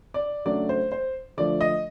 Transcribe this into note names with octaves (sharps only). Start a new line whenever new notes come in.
D5
C#3 F#3 A3 D4 D5
C5
C5
D3 F3 A3 D5
D#5